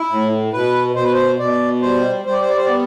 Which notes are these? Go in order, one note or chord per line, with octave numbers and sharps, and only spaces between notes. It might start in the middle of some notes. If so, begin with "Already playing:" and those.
Already playing: E4
A2
B2 B4
B2 C5
B4
C5
B2 D5
G3 C5
G3 C5
D5
C5
D5
C5
B3 D5